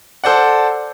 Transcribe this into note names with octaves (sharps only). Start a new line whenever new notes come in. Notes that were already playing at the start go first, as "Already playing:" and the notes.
A4 C5 D5 F#5